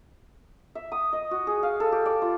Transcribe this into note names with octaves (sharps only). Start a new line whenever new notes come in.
E5
D#6
D#5
F#4
G#4
F5
A4
G4
D5
F4